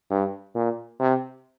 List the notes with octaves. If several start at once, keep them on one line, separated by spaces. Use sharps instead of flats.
G2
A#2
C3